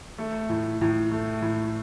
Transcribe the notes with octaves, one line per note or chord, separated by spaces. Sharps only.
A3
A2
A2
A3
A2